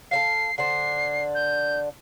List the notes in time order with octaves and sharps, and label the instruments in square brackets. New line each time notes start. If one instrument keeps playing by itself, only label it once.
[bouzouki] A4 C5 F5 [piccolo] C7
[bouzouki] D3 D4 C5 [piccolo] C7
[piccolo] G6